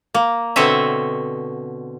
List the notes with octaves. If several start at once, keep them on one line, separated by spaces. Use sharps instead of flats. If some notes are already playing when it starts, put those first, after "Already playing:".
A#3
B2 D3 C4 C#5 D#5 E5